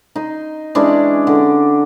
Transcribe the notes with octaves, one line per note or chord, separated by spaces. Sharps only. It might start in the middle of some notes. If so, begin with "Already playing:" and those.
D#4 C6
E3 G#3 C#4 D4
D3